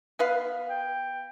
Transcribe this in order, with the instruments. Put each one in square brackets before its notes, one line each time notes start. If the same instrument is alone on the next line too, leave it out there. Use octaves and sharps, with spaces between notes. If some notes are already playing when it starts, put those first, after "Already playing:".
[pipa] B3 B4 F5
[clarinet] G5